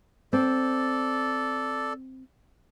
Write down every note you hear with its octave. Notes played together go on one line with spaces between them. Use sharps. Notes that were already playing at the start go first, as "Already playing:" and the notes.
C4 A4 D5